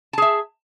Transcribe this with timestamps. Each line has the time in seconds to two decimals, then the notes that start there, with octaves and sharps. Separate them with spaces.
0.13 A5
0.18 G#4
0.22 E5